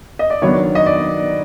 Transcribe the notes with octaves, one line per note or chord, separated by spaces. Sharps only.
D#5
D5
D#3 F#3 B3 D4 C#5
D#5
D5